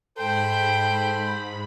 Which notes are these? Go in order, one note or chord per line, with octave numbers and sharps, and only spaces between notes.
G#2 A4 C5 G5 B5